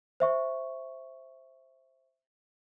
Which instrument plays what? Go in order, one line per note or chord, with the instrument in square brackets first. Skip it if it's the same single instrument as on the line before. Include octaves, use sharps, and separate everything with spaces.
[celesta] C5 E5 C#6